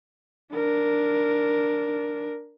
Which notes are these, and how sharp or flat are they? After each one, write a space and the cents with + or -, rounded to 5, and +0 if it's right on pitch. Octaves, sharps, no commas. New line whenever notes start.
D4 +0 A#4 +0